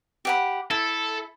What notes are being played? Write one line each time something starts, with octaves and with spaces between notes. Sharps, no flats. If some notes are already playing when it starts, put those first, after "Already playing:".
G4 F#5 B5
E4 A4